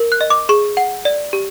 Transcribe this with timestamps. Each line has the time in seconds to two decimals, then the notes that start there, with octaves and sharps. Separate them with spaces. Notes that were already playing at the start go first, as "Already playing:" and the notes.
Already playing: A#4
0.12 F#6
0.21 D#5
0.30 D6
0.49 G#4 C#6
0.77 F#5
1.05 D5
1.33 G4